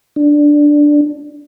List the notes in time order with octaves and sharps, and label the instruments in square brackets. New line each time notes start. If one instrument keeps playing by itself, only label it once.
[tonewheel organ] D4